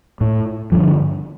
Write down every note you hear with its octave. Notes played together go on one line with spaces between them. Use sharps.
A2
G2 D3 F3